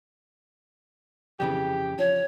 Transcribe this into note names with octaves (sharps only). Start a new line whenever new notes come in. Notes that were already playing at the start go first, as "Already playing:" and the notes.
F2 C#3 E3 G4
F3 C#5